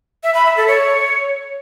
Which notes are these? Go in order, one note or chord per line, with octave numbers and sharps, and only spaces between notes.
E5
B5
E5
A4
C#5